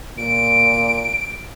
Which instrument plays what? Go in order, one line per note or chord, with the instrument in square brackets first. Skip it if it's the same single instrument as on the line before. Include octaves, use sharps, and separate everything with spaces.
[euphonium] A#2 [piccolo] D7